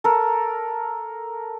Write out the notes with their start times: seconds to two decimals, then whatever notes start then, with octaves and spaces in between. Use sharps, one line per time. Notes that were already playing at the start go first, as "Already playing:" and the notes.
0.04 A4 A#4